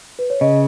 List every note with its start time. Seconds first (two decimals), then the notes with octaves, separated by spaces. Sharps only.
0.19 B4
0.30 C#5
0.41 C#3 D#5